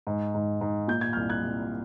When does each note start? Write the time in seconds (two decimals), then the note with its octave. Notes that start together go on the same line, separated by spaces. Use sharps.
0.07 G#2
0.34 G#2
0.61 G#2
0.88 A#2 G6
1.01 G#6
1.13 F6 G6
1.16 C2
1.30 F#6 G#6
1.43 C2